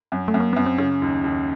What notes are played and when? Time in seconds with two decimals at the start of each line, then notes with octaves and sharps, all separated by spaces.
0.12 F#2
0.28 A3
0.34 F#2
0.40 A#3
0.53 F#2 B3
0.66 C4
0.78 C#3 C#4
1.02 D#2
1.24 D#2